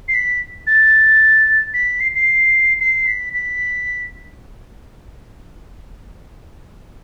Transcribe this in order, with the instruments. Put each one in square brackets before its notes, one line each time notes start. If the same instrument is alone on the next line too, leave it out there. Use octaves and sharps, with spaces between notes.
[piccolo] C7
B6
A6
B6
C7
C7
C7
B6
B6